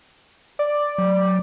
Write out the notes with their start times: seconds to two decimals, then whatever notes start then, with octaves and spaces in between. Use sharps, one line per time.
0.59 D5
0.98 F#3